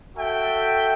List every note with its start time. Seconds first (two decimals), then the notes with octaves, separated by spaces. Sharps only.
0.16 F#4 A4 E5 G5